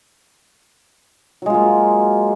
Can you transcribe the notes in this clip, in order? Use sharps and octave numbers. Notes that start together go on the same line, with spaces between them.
F#3 G#3 A#3 F4